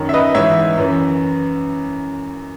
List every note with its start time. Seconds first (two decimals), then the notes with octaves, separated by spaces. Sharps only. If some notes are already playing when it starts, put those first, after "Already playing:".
Already playing: F#2 D#3
0.09 E5
0.14 B4 D#5
0.35 G#2 E3 C#5 E5
0.77 F#2 E3